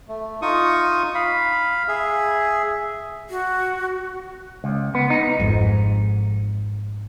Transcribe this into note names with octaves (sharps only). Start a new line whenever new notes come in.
A3
D#4 F4 C#6 D#6
F5 B5
G#4 E5
F#4
C#2
B3
D#4
G#1 F2 G#2